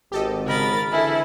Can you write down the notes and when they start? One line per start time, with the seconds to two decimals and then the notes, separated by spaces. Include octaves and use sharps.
0.12 G#1 G4 A4 D#5
0.47 C#3 A#4 D#5 B5 A6
0.92 D3 E3 E4 G#4 A4